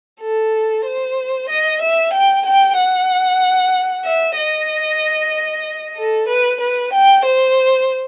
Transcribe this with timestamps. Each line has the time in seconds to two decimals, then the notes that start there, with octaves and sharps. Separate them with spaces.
0.21 A4
0.85 C5
1.49 D#5
1.82 E5
2.13 G5
2.46 G5
2.77 F#5
4.05 E5
4.37 D#5
5.96 A4
6.28 B4
6.61 B4
6.93 G5
7.25 C5